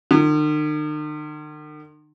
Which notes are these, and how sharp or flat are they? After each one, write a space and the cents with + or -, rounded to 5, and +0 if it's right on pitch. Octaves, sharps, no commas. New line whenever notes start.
D#3 -45